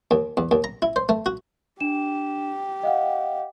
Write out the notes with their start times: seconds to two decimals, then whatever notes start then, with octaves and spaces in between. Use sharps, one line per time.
0.11 D#2
0.37 E2
0.51 D#2
0.64 A#5
0.82 E4
0.96 C5
1.09 A3
1.26 F#4
1.80 D4 G4 E7
2.83 D#5 F5 F#5